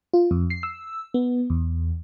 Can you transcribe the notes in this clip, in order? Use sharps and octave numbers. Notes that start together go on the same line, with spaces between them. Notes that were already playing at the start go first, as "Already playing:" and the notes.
F4
F2
C7
E6
B3
E2